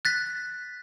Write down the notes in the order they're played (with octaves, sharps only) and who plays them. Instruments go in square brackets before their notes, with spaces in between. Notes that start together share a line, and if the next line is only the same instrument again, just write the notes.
[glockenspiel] F#6 A6 B6